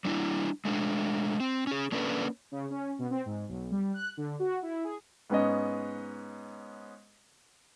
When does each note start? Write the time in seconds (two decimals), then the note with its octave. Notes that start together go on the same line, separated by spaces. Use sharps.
0.05 G3 D4 E4
0.65 G#3 A3 D4
1.40 C4
1.67 C#4 G#4
1.92 A#3 C#4 D4 A4 B4
2.52 C#3
2.70 C#4
2.99 B2
3.11 C4
3.25 G#2
3.48 B1
3.71 G3
3.94 F#6
4.17 D3
4.39 F#4
4.62 E4
4.84 G#4
5.30 G#2 B3 C#4 D#5